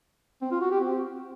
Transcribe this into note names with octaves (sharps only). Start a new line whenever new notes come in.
C4
F4
F#4
G4
C4